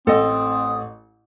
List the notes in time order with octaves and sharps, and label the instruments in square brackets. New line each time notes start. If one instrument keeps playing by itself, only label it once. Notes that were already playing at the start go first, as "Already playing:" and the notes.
[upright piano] A1 [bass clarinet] C4 [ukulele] A4 D#5 [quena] D#6